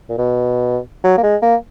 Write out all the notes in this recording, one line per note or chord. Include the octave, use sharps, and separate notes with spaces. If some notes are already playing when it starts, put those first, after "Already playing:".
A#2
B2
F#3
A#3
G#3
A#3